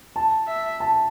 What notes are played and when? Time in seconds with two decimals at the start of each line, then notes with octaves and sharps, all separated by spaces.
0.16 A5
0.47 E5
0.80 A5